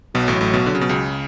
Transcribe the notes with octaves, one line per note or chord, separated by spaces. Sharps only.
B1 B2 F#3
A1 A2
A1 A2
B1 B2
D3
C#3
B2
C#2 C#3